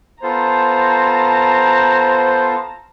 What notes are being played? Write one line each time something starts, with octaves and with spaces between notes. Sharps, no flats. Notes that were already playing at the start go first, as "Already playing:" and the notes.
B3 F4 A4 C5 A5 A#5